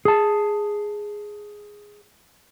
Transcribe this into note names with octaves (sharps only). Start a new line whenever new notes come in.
G#4 A5